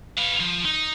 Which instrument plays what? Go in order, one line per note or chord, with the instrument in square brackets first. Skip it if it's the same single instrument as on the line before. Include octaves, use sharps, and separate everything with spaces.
[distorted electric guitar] B4 F5
F3
D#4